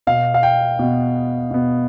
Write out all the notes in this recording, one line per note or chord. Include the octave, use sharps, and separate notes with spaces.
B2 B3 F5
F5
G5
B2 B3
B2 B3